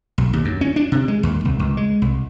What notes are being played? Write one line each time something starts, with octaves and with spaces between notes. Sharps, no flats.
B1
D#2
F#2
C#4
D4
C3
G#3
D#2
C2
C#2
G#3
C2